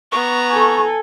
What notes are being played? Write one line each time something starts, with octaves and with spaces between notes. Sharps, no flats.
B3 A#5 C#6
A4 G#5